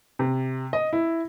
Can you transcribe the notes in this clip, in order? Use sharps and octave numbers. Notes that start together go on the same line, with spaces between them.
C3
D#5
E4